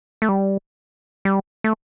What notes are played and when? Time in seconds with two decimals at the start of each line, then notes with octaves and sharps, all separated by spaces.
0.22 A3
0.29 G3
1.25 G3
1.64 A3